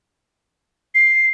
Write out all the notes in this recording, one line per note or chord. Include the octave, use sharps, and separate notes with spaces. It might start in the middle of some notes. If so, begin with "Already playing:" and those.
C7